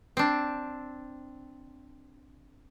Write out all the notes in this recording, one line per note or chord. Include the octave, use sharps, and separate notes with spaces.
C4 D4